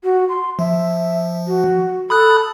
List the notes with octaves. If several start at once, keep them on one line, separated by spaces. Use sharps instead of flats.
F#4
C6
F3 E5
F#4
A4 B5 D#6 F#6